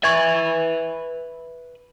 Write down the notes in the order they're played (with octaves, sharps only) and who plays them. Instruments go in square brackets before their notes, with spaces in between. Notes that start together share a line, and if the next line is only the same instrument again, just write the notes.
[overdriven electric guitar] B4 E5 [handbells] C#6 G#6 A6